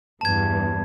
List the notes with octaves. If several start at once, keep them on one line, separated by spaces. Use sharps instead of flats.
E2 G2 A5 G#6